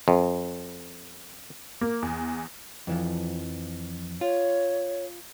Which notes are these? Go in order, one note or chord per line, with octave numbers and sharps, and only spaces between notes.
F2
A#3
E2
F2 E3 F3
F4 C#5